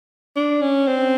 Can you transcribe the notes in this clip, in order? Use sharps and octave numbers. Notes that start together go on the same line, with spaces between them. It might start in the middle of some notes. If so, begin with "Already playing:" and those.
D4
C#4
C4